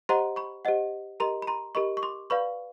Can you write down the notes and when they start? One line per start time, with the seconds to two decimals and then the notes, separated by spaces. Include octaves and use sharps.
0.09 G4 C5 D#5 F#5 A#5 C6
0.36 B5 C#6
0.65 G4 C5 D#5 F#5
1.20 G4 A#4 D#5 A#5 C6
1.42 B5
1.47 A#5 C6
1.75 G4 A#4 D#5 B5 C#6
1.97 C#6
2.03 C6 D6
2.30 B4 D5 F5 B5 C#6